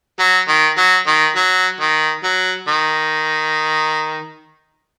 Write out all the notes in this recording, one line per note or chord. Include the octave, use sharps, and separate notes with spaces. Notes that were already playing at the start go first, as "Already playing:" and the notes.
F#3
D#3
F#3
D#3
F#3
D#3
F#3
D#3